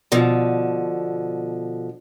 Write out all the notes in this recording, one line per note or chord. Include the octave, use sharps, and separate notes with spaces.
B2 D3 F3